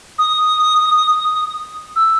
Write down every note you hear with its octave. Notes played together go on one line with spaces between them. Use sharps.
D#6
E6